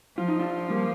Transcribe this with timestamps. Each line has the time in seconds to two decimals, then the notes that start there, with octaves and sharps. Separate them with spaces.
0.17 F3 F4
0.28 D#4
0.39 D4 F4
0.70 G3 A#3